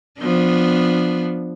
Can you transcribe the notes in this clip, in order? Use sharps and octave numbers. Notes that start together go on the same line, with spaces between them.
F3 B3 D4